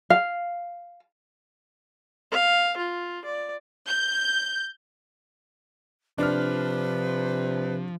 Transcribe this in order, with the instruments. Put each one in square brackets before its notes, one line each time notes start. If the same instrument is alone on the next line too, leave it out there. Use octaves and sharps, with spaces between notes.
[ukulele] F5
[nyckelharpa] F5
F4
D5
[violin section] G6
[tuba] C3 [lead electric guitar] F3 [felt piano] D4 F6 [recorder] B4